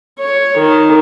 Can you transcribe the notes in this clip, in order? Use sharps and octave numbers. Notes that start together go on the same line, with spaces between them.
C#5
D#3